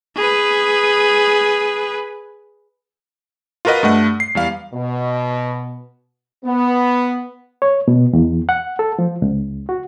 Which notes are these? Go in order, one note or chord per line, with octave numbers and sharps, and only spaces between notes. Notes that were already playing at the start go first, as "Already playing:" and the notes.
G#4 B4
F4 F#4 A#4 B4 D#5 F#5
G2 A3 F#5
C7
E2 G3 F5
B2
B3
C#5
B2
E2
F#5
A4
F3
C#2
F#4